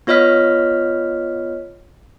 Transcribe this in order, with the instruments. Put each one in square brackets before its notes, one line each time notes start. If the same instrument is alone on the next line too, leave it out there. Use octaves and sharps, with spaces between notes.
[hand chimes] B3 F4 C#5 D#5 F6 B6